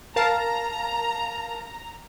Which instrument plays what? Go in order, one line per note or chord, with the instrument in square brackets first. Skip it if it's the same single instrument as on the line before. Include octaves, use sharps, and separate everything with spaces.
[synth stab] A#4 F5 A5 [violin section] A#5